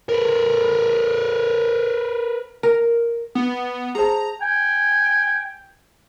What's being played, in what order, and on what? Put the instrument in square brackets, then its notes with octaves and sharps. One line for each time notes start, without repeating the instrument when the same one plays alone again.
[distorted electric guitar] A#4 B4
[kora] A#4
[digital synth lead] B3
[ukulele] G#4 C5 A5 [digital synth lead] A#5
[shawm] G5 [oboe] G#5